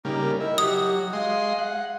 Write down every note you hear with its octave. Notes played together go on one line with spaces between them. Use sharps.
C#3 G3 A#3 D#4
A#4
E4 D#5
F#3 G4 D#6
G#3 D#5 F5 C6
F#5